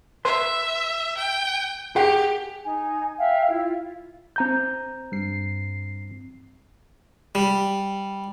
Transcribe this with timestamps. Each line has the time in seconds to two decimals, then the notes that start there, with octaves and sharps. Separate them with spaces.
0.25 B4 E5 C6
1.18 G5
1.96 G4 G#4 F#5 G5
2.65 D#4 G#5
3.18 E5 F5 G5
3.50 E4 F4
4.36 C4 A#5 G6
5.12 G2 C7
7.35 G3